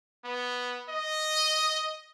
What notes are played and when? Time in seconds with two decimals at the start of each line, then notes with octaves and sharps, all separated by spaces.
0.25 B3
0.89 D#5